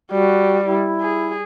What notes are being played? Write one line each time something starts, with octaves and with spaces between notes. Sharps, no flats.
G3 F#4
E4
G#4